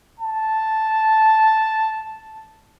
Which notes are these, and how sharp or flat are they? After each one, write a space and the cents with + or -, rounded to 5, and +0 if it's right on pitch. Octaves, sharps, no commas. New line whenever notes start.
A5 -5